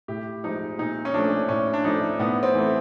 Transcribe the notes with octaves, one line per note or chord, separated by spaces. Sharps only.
A2 G4
F3 G#3 D#4
A#2 D#4
C#4
F3 A3 D4
A2 C#4
D4
F3 A3 D#4
A2 B3
C4
E3 A3